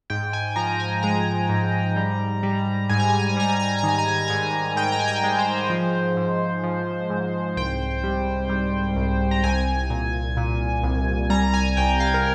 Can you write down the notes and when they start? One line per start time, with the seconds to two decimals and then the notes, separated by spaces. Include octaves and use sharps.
0.10 G#2 G5
0.33 G#5
0.56 F3 A#5
0.80 G#5
1.03 G#3 A#5
1.49 G#2
1.96 G3
2.43 G3
2.89 G#2 G#5
3.00 A#5
3.10 G#5
3.19 A#5
3.29 G#5
3.37 G3 A#5
3.49 G#5
3.59 A#5
3.69 G#5
3.78 D#3 A#5
3.88 G#5
3.98 A#5
4.08 G#5
4.18 A#5
4.28 G#2 G#5
4.76 G#2 G5
4.92 A#5
5.00 G#5
5.08 G5
5.24 G#3
5.39 C5
5.70 F3
6.17 G#2
6.63 F3
7.10 G#2
7.57 C2 G5
8.04 G3
8.49 G3
8.96 C2
9.31 A#5
9.44 C2 G#5
9.90 A#2
10.37 A#2
10.83 C2
11.30 G3 A#5
11.54 G#5
11.77 C2 G5
12.00 F5
12.14 A#4